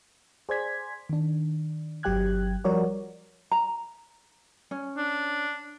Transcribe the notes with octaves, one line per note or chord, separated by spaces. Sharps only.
G#4 C5 D5 G#6 B6
D#3 D4
G1 F#3 G4 G5 F#6 G#6
F3 G3 F#4 A#4 C#5 D5
A#5
C#4
D4